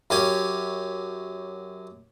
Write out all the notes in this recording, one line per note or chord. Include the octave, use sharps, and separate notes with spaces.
F#2 C#4 G4 G#5